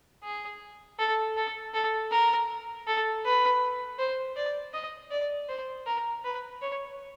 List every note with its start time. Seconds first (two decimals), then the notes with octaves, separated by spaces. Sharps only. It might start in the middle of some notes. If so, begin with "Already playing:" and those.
0.24 G#4
0.99 A4
1.37 A4
1.74 A4
2.11 A#4
2.87 A4
3.24 B4
3.98 C5
4.37 D5
4.73 D#5
5.11 D5
5.49 C5
5.86 A#4
6.24 B4
6.61 C#5